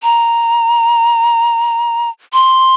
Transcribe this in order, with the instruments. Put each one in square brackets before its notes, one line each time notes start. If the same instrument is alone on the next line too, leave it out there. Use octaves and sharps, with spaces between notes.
[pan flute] A#5
C6